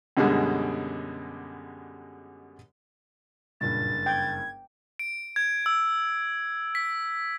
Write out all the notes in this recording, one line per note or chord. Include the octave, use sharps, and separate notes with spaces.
F#2 B2 D3 G3 G#3
F#1 G2 A#2 A6
G5 G#6
D7
G#6
E6
B6